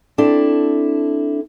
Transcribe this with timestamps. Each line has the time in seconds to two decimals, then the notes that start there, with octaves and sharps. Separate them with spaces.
0.18 C4 D4 E4 A4